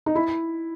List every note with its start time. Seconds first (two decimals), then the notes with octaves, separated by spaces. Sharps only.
0.06 D#4
0.15 E4